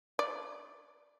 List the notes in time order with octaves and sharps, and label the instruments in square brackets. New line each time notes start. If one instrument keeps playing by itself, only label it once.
[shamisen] D5